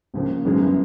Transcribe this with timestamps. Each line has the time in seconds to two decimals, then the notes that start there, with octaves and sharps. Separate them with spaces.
0.14 C#2 C#3 F3 A#3
0.45 G1 F#2 C#3 E3 G#3